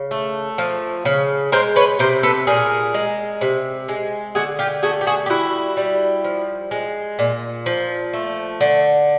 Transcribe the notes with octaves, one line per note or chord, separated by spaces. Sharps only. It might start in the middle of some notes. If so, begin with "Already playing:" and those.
Already playing: C#3
A3
F3
C#3
G#3 A#4 C5
B4 C#5
C3 A#4 C5
A4 B4
A#2 G#4 A#4
G#3
C3
G#3
D3 F#4 G#4
F4 G4
A3 F#4 G#4
G4
F#4 G#4
G4
G3 E4 F#4
G3
F3
G#3
A#2
F3
A3
D3